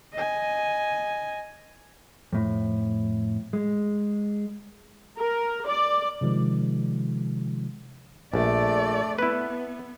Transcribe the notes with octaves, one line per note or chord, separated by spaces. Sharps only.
D#5 G#5
F2 A2
G#3
A#4
D5
C3 D#3 F3 G#3
A#1 A3 D5
B3 E4 B4